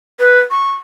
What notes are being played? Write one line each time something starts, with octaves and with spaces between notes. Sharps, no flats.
B4
C#6